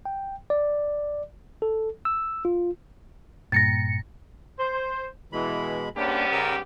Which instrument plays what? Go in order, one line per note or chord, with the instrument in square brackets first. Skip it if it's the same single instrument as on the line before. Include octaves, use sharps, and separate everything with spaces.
[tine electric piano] G5
D5
A4
E6
F4
[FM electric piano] G2 A#2 C#7 [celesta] A6 A#6
[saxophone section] C5
[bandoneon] B2 G#3 B5 [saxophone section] E3
[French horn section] G#2 B3 G4 [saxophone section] G3 C#4 [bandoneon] A#3 D4
[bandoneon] C#3 A#4 E6